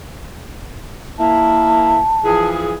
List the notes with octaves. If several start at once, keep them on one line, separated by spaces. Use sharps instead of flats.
A#3 E4 A5
E3 F3 G#4